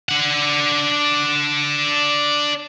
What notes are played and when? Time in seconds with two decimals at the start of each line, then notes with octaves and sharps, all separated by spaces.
0.09 D4 F#5